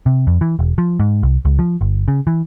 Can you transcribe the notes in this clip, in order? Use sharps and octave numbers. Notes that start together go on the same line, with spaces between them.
C3
F2
E3
E1
F3
G#2
C2
C#2
F3
G1
C#3
E3